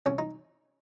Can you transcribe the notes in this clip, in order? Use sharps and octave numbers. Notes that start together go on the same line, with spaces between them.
C2 C#4
D#4